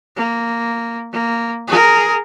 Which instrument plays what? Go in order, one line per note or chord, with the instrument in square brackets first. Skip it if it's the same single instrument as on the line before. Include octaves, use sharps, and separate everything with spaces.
[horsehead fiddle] A#3
A#3
G#4 A#4